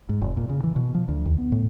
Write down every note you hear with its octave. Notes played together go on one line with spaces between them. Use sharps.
G#2
F1
A#2
C#3
E3
B2
F3
D2
D#2
B3
A2